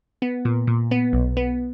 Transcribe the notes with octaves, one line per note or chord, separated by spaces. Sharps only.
B3
A#2
A#2
B3
B1
B3